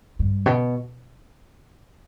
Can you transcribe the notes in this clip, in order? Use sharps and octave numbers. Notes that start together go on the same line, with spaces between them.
G2
B2